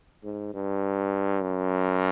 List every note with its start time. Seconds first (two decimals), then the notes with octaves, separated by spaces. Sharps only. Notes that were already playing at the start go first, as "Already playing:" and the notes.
0.24 G#2
0.54 G2
1.42 F#2